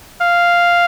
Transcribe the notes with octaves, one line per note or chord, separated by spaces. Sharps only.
F5